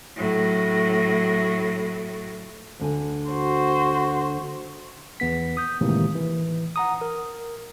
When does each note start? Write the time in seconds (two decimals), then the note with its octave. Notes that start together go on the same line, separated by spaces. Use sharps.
0.16 A2 F#3
2.80 D2 D3 G#5
3.30 F#4 C5
5.20 E2 B3 B6
5.57 D#6 G6
5.81 A2 C3 D#3 E3 G#3 A#3
6.15 E3
6.76 F#5 A#5 D#6
7.01 A#4